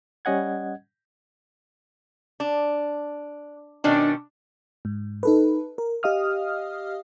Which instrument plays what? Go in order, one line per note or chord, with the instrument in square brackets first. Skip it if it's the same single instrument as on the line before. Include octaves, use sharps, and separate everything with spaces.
[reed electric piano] G3 C#4 D#5 F#5 G#6
[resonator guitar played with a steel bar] D4
[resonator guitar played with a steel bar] B2 D#3 C#4 [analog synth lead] D4
[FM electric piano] G#2
D#4 A4 B4
A#4
G4 D#5 F5 D#6 F6